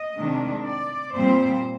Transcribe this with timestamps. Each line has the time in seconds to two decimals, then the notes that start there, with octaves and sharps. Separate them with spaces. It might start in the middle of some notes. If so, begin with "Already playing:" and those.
Already playing: D#5
0.16 C3 D#3 G#3 D4
0.64 D5
1.13 A#2 G3 C4 C5